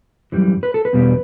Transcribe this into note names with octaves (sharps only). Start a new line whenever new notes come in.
F#2 E3 G3
B4
A4
B4
E2 B2 G3 D4